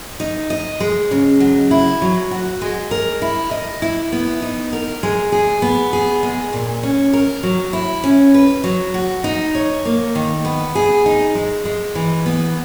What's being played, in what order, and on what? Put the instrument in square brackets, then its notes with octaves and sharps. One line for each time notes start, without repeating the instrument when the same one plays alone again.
[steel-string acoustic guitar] D#4
D#5
G#3
C#3
F#3
E4
F#3
F#4
G#3
A#4
E4
D#5
E4
B3
D#4
A#4
G#3
G#4
B3
G#4
G#3
A#2
C#4
A#4
F#3
E4
C#4
B4
F#3
F#4
D#4
C#5
A#3
D#3
B3
G#4
D#4
G#3
G#3
E3
B3